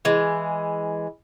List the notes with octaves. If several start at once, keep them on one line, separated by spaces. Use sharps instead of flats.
E3 G#3